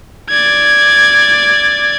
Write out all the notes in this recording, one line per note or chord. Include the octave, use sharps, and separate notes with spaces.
D5 G#6